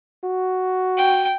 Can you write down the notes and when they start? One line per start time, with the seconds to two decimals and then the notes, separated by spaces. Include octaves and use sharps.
0.24 F#4
0.98 G5